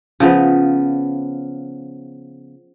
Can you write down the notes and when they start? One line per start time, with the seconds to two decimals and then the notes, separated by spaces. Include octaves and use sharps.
0.20 C#3 F3 B3